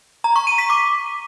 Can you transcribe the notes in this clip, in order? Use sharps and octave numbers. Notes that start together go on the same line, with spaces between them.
A#5
C#6
D#7
B6
D6